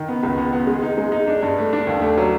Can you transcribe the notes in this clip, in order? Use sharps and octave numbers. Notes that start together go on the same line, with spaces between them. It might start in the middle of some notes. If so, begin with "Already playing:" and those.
Already playing: D#3
B3
C#2
B3
B3
G#3
D#4
G#3
D#4
D4
G2
A3
D4
D#2
A3
F#3